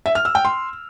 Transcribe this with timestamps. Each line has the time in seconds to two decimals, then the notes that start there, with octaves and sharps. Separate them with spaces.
0.06 E5
0.15 F6
0.25 E6
0.35 G5
0.45 C6